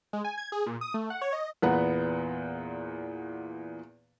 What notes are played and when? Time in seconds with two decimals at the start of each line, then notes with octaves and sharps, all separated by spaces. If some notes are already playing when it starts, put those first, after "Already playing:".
0.13 G#3
0.24 G#5
0.38 G#6
0.52 G#4
0.66 A#2
0.81 D#6
0.94 A3
1.10 F#5
1.21 C#5
1.33 D#5
1.62 E2 A#2 B3 B4 F#5 A#5